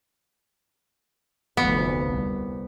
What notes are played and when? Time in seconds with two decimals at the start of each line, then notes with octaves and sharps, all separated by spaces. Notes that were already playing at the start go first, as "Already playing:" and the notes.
1.57 F1 D2 F3 B3
2.05 C2